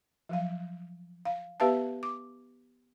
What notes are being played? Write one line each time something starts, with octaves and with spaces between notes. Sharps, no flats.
F3 F#3 F5
F5
B3 G4 B4 E5 F5 A5
D6